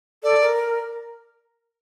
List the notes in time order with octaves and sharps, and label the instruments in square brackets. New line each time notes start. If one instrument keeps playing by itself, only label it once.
[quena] A4 [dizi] D5
[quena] A#4